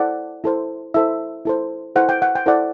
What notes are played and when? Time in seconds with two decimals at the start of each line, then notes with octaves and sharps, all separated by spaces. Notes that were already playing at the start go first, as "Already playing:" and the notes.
Already playing: E4 A4 C5 D5 F#5
0.44 E4 A4 C5
0.94 E4 A4 C5 E5
1.45 E4 A4 C5
1.96 E4 A4 C5 F#5
2.09 G5
2.22 F#5
2.35 G5
2.46 E4 A4 C5 D5 F#5